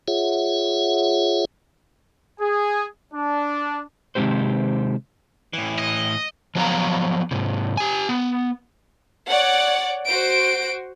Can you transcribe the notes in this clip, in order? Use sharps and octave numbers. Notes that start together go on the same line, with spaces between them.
F4 G#4 C#5 E5 F#5
G#4
D4
C3 D#3 G#3 C4 G4 C5
A2 E3
D#5
F3 F#3 A3 B3 F5 A#5
G#2 C3
G4 G#5
B3
C#5 D5 F#5
F#4 C5 D7